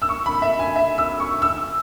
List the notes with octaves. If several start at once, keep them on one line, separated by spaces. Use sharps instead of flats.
E6
C#6
B5
E5
G#5
E5
E6
C#6
E6